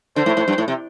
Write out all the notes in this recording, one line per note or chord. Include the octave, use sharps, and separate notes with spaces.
D3 C5
A2
A2
G2
A2
C3